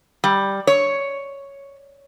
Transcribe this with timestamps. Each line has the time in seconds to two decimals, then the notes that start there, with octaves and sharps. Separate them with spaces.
0.24 G3
0.67 C#5